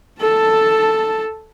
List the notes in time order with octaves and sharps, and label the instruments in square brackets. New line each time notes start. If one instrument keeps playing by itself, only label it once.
[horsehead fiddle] A4 A5